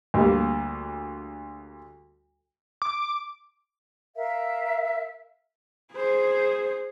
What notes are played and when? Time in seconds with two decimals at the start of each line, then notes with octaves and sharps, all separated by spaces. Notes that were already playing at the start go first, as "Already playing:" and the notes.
0.14 D2 G3 A#3
2.82 D6
4.16 A#4 E5 F5
5.92 G#4 C5